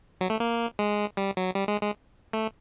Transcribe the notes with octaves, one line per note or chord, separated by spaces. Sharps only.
F#3
A3
A#3
G#3
G3
F#3
G3
G#3
G#3
A3